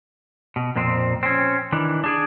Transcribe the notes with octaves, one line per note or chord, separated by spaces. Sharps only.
B2
F2 A#2 F3 C4
C4 C#4
D#3 E3 D4
D4 G#4 D5